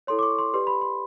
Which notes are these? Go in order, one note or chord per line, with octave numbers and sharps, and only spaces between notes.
E4 A4 C#5 C6
D6
C#6
C6
G4 B4 D5 C6
B5
C6